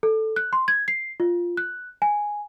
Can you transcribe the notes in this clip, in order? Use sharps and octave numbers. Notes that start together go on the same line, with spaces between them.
A4
F#6
C6
G#6
C7
F4
F#6
G#5